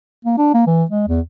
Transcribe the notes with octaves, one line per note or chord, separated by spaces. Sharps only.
A#3
D4
A#3
E3
G#3
E2